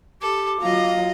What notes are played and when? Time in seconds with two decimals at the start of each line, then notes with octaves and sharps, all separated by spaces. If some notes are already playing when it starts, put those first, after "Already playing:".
0.22 G4 A4 D6
0.61 F#3 F4 D#5 F5 A#5